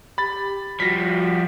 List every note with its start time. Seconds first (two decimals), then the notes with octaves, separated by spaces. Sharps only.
0.18 G4 B5 A6
0.80 F3 G3 F#4 A#6 B6